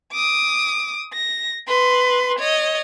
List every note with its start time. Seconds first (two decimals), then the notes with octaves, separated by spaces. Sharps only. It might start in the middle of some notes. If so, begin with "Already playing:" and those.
0.12 D6 D#6
1.13 A#6
1.68 B4 C6
2.39 C#5 D#5